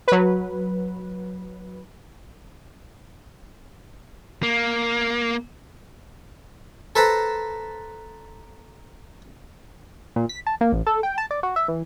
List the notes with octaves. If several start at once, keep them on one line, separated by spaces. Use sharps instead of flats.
F#3 B4
A#3
A4 B4 C5 A5 A#5
A#2
B6
A5
A#3
A1
A4
G5
A5
D5
F#4
E5
E3